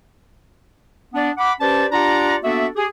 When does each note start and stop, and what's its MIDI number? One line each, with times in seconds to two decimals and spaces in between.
1.14 1.30 59
1.14 1.30 62
1.38 1.52 78
1.38 1.52 83
1.38 1.52 86
1.60 1.86 61
1.60 1.86 67
1.60 1.86 71
1.60 1.86 72
1.60 1.86 74
1.60 1.86 81
1.92 2.36 62
1.92 2.36 65
1.92 2.36 67
1.92 2.36 74
1.92 2.36 78
1.92 2.36 82
2.43 2.67 58
2.43 2.67 59
2.43 2.67 62
2.43 2.67 66
2.43 2.67 69
2.43 2.67 76
2.76 2.85 67
2.76 2.85 68